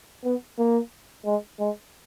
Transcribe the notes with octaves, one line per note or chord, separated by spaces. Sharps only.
B3
A#3
G#3
G#3